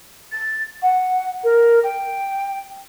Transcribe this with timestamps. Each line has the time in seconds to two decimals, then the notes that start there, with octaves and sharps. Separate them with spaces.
0.32 A6
0.82 F#5
1.44 A#4
1.84 G5